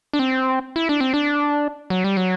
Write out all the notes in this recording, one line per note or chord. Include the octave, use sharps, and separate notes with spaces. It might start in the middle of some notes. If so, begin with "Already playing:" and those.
D4
C4
E4
D4
C4
D4
F#3
G3
F#3